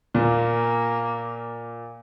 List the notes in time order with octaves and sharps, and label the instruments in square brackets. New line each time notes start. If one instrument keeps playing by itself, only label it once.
[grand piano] A#2 [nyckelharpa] A#3